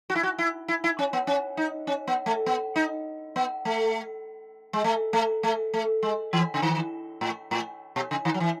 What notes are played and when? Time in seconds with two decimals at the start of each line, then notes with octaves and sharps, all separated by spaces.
0.10 F#4
0.15 E4
0.23 F#4
0.39 E4
0.68 E4
0.84 E4
0.99 C#4
1.13 B3
1.27 C#4
1.57 D#4
1.87 C#4
2.08 B3
2.26 A3
2.46 B3
2.76 D#4
3.36 B3
3.65 A3
4.73 G#3
4.84 A3
5.13 A3
5.43 A3
5.74 A3
6.03 G#3
6.33 E3
6.54 C#3
6.62 D#3
7.21 A2
7.51 A2
7.96 B2
8.11 C#3
8.25 D#3
8.34 F#3
8.40 E3